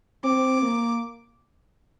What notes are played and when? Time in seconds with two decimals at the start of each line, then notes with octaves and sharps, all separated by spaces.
0.24 C4 D6
0.62 A#3